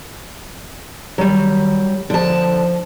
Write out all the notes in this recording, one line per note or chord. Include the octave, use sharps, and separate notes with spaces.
D#3 F#3 G3
D3 F3 A5